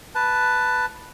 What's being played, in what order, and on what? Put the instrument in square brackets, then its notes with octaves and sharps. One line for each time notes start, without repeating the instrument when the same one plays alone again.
[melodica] B4 A5